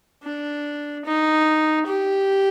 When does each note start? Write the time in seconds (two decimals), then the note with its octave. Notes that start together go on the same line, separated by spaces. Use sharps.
0.24 D4
1.05 D#4
1.87 G4